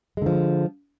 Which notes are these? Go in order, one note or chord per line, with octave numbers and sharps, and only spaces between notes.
D3 F3 G#3